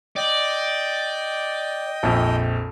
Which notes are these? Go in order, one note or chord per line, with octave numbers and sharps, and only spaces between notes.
D5 D#5 G5
A#1 F2